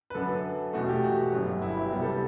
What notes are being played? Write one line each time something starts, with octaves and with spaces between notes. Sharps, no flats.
B4
F#2 D3 F#3 A4
E2 B2 A3 F#4
G4
F#4
G1 F#2 F#3
E4
G4
C2 C3 G3 B3 G4
A4
G4